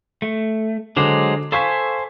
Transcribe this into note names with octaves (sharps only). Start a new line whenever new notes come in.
A3
D3 F#3 G#3 C5 D6
A4 C5 F5 G#5 C#6 B6